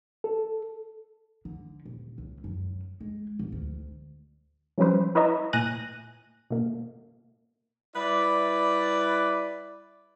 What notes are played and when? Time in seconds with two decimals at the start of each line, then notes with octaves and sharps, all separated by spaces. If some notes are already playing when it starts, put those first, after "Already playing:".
0.24 A4
1.45 D3
1.85 D#1
2.18 C#2
2.44 F#2
3.01 G#3
3.39 D1
3.52 D2
4.78 F3 G3 C#4 B4 C5
5.15 E4 B4 C#5 D#5 E5 A#5
5.53 A#2 G#5 F#6 A#6 D#7
6.50 B2 A#3
7.95 G3 E4 B4 D5